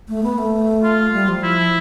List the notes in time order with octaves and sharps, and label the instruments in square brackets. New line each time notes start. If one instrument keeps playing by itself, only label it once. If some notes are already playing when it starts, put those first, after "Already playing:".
[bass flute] A3
B3
A3
[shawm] F4
[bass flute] G3
F3
[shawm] E4